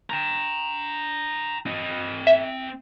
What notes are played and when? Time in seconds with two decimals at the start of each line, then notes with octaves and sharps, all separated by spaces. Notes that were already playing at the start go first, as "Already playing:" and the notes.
0.10 G5 A#5
1.66 C4 D#5
2.27 E5